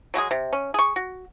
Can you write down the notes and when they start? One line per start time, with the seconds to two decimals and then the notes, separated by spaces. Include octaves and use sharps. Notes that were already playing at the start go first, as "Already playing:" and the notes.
0.14 F#3 G#3 F#4 G#4
0.31 C3
0.53 C#4
0.74 G#4 C#6
0.96 F#4